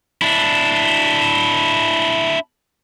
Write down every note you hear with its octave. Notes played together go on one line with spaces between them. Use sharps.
D4 E4